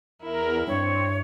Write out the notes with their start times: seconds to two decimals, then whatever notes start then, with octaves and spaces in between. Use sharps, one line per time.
0.22 E2 E4 A#4
0.67 G2 C4 C#5